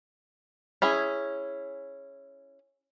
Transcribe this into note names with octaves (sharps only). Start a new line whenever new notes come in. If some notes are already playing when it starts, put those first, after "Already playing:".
C#4 E4 G#4